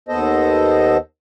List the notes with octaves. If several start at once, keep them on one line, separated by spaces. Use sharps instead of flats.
D#2 B3 A4 C5 D#5